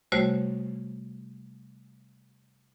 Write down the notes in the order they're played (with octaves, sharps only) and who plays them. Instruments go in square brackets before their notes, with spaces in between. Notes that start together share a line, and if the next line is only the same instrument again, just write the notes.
[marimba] C3 G3 A3 F#4 C5 C#5